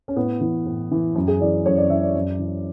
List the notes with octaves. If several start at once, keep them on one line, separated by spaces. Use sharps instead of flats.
C#4
A2 B3
E3
A2
E3
F#2
G#4
E3 D5
F#2 C#5
D5
E3 E5
D5
F#2
E3